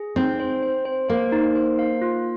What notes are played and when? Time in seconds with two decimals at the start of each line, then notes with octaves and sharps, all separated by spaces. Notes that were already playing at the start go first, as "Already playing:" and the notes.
Already playing: G#4
0.16 C4 D#4
0.40 C5
0.63 C5
0.85 C5
1.09 A#3 C5
1.32 D#4
1.55 C5
1.79 F5
2.02 F4